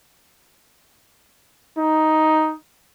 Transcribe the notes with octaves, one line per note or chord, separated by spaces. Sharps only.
D#4